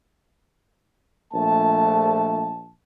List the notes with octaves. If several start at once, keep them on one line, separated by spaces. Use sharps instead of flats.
A#1 A3 A5